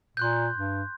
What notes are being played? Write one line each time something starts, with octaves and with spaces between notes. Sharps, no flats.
A#2 C6 F#6 G6
G2